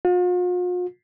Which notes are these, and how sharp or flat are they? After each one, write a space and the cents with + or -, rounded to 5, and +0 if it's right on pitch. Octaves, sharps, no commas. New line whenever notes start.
F4 +45